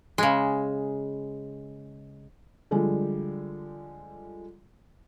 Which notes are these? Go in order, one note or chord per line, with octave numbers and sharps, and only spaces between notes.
C#3 G#3
D3 F3 G3 G#3